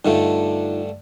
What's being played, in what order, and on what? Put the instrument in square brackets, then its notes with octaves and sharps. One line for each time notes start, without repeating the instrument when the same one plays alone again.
[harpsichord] G2 D3 A3 [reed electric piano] D#4 F4